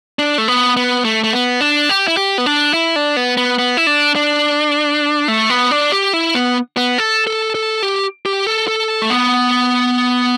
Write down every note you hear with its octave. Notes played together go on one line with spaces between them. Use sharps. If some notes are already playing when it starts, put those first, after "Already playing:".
D4
A3
B3
B3
A3
A3
B3
D4
G4
E4
G4
B3
D4
E4
D4
B3
B3
B3
E4
D4
D4
A3
B3
D4
G4
E4
B3
B3
A4
A4
A4
G4
G4
A4
A4
A3
B3